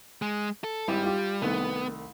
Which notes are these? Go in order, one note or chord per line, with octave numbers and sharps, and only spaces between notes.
G#3
A4
G#1 G3 E4 G4
F4 G4
C2 D#3 A3 B3